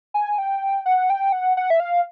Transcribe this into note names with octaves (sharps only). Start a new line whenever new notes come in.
G#5
G5
F#5
G5
F#5
F#5
E5
F5